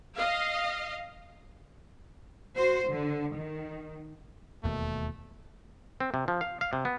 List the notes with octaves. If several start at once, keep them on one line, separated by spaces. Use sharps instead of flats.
D#5 F5
F#4 C5
D3
D#3
E1 D#2 B2 A3
C4
C3
F3
F5
F5
C3
B3